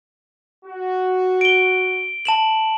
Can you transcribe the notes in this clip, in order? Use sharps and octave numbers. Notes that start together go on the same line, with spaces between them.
F#4
D7 G7
A5 E7 F#7